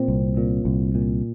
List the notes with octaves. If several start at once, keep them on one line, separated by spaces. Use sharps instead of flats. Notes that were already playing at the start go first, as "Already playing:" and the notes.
Already playing: A#2 C4
C2
A#2
C2
A#2